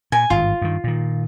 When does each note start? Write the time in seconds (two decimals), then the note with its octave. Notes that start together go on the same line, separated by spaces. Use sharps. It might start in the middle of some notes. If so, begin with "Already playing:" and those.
0.12 A#2 G#5
0.30 G#1 G2 F4
0.62 G2 D#3
0.84 A#2 D#3